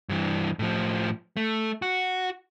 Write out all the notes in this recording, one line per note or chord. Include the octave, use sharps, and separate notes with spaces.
G2 E3
A2 F3
A3
F#4